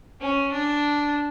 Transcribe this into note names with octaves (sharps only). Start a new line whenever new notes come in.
C#4
D4